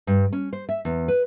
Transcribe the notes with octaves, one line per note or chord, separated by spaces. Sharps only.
G2
C#4
C5
E5
E2
B4